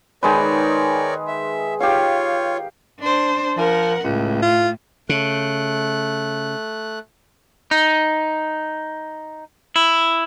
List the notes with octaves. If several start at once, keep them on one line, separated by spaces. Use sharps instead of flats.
D#3 G#3 A#4 B4 C#5 D5
E5
F4 G4 C#5 F5
D4 C5
F3 A#4 F#5
C#2 A2
F4
C#3 A3 F#6
D#4
E4